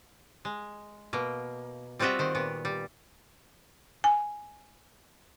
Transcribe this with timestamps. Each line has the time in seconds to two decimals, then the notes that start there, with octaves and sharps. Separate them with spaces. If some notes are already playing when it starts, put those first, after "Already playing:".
0.45 G#3
1.13 B2 A#3
1.99 G3 C4 F4 F#4 D#5 E5
2.19 D#3 C5
2.35 A#2 B3
2.65 G3
4.04 G#5